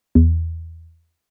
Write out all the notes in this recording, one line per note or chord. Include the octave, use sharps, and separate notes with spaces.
E2